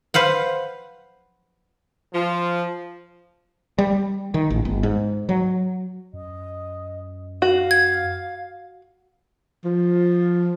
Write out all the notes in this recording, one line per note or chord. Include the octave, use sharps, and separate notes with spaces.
B4 C5 F5 F#5
F3
G3
D#3
A1
G1
G#2
F#3
F#2 D#5
F#4 F5
G#6
F3